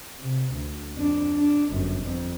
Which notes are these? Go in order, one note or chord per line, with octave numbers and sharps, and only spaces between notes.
C3
D2
F2 D4
D4
G1 F#2
F2